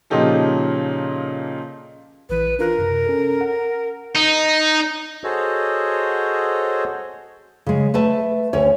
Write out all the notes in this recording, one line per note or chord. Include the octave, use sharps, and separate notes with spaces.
A#2 C#3 F3 D#4 G4 A4
A#1 E3 B4
D4 F4 A#4 F#6
F#2 C3
C#4 A4
F#5
D#4
F#4 G#4 A4 C5 C#5 D#5
C#3 G#3
A3 B4 E5 A5
D2 C#4 C#5